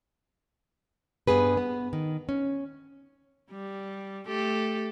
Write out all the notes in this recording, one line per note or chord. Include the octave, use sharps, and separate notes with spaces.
G2 B3 G#4 B4
B3
D#3
C#4
G3
A3 G4 A4